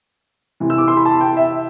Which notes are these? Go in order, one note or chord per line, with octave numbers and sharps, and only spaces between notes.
C3 E3
E6
D6
C6
B5
A5
G5
E5